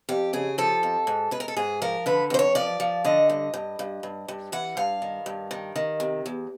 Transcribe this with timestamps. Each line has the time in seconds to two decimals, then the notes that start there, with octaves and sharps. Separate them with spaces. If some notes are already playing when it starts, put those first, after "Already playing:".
0.09 F2 G4
0.33 C#3 G#4
0.58 F3 A4
0.83 F2
1.07 G#2
1.31 G#2 B4
1.40 A#4
1.48 A4
1.57 G#2 G#4
1.82 F3 A#4
2.06 D3 B4
2.30 F2 C5
2.39 C#5
2.55 F3 D5
2.80 F3
3.05 D3 D#5
3.30 G2
3.54 G2
3.79 G2
4.03 G2
4.28 G2
4.52 E3 F#5
4.77 G2 F5
5.02 D#3
5.26 G2
5.51 D#3
5.76 D#3
6.00 C3
6.26 E2